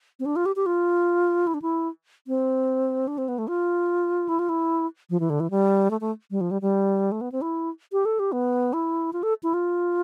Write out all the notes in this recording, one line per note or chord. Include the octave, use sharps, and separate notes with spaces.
C4
D4
F4
G4
G4
F4
E4
D4
E4
C4
D4
C4
B3
A3
F4
E4
F4
E4
F3
E3
D3
E3
G3
A3
A3
G3
F3
G3
G3
A3
B3
C4
E4
G4
A4
G4
B3
E4
F4
A4
E4
F4